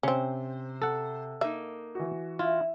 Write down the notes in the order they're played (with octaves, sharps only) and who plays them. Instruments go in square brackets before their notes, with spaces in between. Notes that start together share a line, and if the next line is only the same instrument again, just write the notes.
[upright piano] C3 [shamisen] C4 C#4 [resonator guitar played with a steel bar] C5
[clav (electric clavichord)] A4 F#5
[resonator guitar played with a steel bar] A#3 D#4 [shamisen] E5
[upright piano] E3 F#4
[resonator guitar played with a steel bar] E4 [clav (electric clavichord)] F4